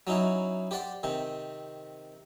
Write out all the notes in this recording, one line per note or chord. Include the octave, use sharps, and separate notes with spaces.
F#3 C#4 D#4 E4 F#4
G4 C5 D5 F#5 C6
C3 D#3 C4